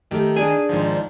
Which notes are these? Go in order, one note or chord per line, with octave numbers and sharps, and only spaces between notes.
D#3 A3 G4 A#4
D4 G#4 D5 G#5
G#2 D#3 F3